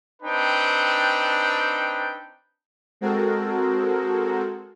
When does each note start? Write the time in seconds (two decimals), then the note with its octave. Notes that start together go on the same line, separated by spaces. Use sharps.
0.23 C4 D4 D#4 B4 G5
3.01 G#3 C4 F#4 A4 A#4